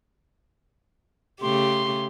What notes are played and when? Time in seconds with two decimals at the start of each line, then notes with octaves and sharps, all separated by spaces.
1.42 C#3 A3 G4 C6